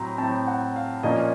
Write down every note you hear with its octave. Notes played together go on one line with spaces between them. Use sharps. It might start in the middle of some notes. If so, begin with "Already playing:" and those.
Already playing: A2 F#3 C4 A#5 C6
A2 F#3 C4 A5
F#5
F5
A#2 F3 A#3 C#4 D#5